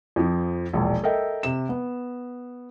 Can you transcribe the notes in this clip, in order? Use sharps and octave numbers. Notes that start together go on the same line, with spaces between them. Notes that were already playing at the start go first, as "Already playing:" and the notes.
F2 F3
E1 A#1
A4 A#4 D#5 E5 G5
C3 E7
B3